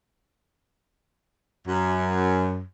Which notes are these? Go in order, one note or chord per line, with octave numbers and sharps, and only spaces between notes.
F#2